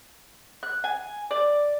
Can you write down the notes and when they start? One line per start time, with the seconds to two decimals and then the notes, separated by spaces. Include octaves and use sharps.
0.63 F#6
0.84 G#5
1.31 D5